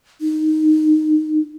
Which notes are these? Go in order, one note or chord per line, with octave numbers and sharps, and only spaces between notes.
D#4